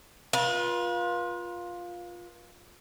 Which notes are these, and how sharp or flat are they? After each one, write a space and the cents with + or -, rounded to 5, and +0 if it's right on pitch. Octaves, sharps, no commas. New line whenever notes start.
F4 +10 B4 -40